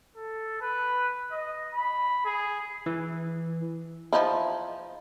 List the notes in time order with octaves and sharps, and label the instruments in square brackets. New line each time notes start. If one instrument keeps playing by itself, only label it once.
[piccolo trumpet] A4
B4
D#5
B5
G#4
[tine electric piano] E3
[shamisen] F3 D#4 E4